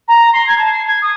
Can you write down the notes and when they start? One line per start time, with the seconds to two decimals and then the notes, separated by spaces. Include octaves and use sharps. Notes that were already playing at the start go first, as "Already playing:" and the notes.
0.08 A#5
0.33 C6
0.47 G#6
0.58 A5
0.72 C7
0.87 G#6
1.02 D#6